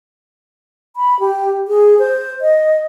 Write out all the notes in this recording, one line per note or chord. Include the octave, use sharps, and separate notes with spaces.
B5
G4
G#4
C5
D#5